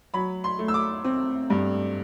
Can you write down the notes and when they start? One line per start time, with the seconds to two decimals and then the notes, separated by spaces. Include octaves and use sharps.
0.14 F#3 B5
0.44 C6
0.59 A3
0.68 E6
0.74 D6
1.04 C4
1.50 G2